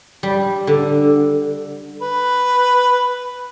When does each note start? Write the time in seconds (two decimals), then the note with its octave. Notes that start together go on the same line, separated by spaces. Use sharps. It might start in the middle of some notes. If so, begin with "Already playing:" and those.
0.23 G3
0.67 D3
2.02 B4